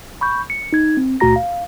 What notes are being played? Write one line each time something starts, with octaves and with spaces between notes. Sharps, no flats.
B5 C#6 G6
C#7
D#4 G#6
C4
C#2 A#2 A3 F#4 A#5 A#6
F5